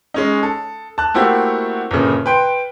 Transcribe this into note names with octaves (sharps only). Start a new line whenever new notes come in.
G#3 C#4 D#4
A4
A5 F#6
A3 A#3 C4 E4 F#4 G4
G1 A#2 C#3
B4 G5 C6